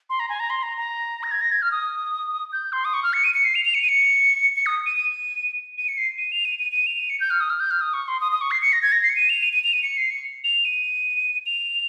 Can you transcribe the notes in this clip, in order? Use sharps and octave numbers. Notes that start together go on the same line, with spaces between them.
C6
A#5
G#5
A#5
C6
A#5
A#5
A#6
G#6
A#6
G#6
F6
D#6
G6
C6
D#6
C#6
F6
C#7
D#7
C#7
C7
F7
F7
C#7
D#7
C#7
C#7
D#6
D#7
D#7
D#7
C#7
C7
D#7
F7
D#7
D#7
D#7
F7
D#7
C#7
G6
F6
D#6
F6
G6
F6
D#6
C#6
C6
D#6
D#6
C#6
C7
C#7
A#6
G#6
A#6
C7
C#7
D#7
F7
D#7
D#7
F7
D#7
C#7
C7
C#7
F7
D#7
F7